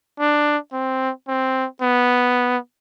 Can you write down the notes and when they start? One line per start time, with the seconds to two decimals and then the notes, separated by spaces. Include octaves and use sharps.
0.19 D4
0.73 C4
1.28 C4
1.82 B3